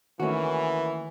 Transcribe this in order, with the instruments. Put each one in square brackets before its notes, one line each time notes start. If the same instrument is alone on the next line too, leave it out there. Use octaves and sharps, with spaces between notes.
[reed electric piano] D#3 A3 [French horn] E3 [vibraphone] A#3 A#4 G#5 [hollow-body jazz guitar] C#4 F#4